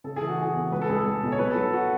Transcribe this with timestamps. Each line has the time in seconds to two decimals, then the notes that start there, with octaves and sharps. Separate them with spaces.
0.04 C#3 A4
0.16 E3 G#4
0.29 F#4
0.38 E3 G#4
0.54 E2
0.71 C#2 B4
0.82 A4
0.89 C#2 G#4
0.99 A4
1.06 C#2
1.23 B2
1.32 C#5
1.39 F#3 B4
1.50 F#3 A4
1.73 F#4